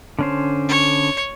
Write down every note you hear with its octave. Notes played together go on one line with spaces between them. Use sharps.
D3 C#4 C5
C#5